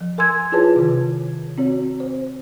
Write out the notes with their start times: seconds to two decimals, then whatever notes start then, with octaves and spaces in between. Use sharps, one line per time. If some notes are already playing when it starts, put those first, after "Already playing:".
0.01 F3
0.18 A#4 G#5 C6 E6 G#6
0.52 E4 F4 G#4 B4 C#5 A5
0.76 C3 D#3
1.58 C4 F#4 C#5
2.00 C5